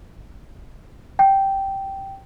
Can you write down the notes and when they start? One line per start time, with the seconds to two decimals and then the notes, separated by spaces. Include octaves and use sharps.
1.19 G5